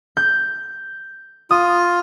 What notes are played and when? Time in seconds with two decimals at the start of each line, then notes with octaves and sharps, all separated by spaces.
0.17 G6
1.51 F4 D#6